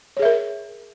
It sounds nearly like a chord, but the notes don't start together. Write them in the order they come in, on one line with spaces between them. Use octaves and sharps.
C#5 G#4 E5 A#4